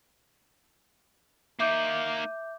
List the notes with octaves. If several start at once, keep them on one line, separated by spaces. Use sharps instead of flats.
A#3 D#4 E5 D6 G6